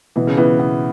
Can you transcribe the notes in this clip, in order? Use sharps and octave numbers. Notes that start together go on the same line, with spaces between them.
B2 E3
C#3
E3 B3
B3